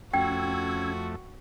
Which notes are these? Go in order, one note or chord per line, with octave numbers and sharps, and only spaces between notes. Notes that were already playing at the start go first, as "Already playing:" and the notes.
F2 A3 C#4 F#4 G5 E6 G#6